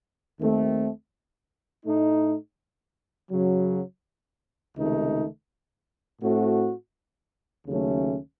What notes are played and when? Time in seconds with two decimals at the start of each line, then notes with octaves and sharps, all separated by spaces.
0.38 D#2 D#3 A3 C4
1.84 A2 A3 D#4
3.30 F#2 C#3 F#3
4.76 C#2 C3 D#3 A3 D#4
6.21 A2 A3 C4 F#4
7.67 D#2 C#3 F#3 A3 C#4